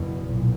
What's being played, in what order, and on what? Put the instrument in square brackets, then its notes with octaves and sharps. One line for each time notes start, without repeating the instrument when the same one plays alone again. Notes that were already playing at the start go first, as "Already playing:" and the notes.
Already playing: [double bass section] F#1 E2 B2
B1 A#2